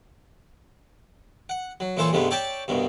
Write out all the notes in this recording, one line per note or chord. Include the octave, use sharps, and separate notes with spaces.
F#5
F#3
A#2 E3 A4 C5 C#5
G2 C3 G#3 A3 B3
C#5 D5 E5 G5 A5
C2 G2 B2